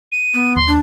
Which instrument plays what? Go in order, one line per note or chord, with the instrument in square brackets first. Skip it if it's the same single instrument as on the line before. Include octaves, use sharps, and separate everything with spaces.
[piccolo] D#7
[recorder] B3
[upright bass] D#2 [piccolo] C6
[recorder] D4